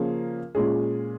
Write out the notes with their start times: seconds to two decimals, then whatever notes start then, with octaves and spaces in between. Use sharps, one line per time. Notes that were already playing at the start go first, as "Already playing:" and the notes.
Already playing: C#3 F3 A#3 C#4 G#4
0.55 A#2 G#3 C#4 G#4